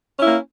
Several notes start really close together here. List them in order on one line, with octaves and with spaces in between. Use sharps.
C#4 E4 A#3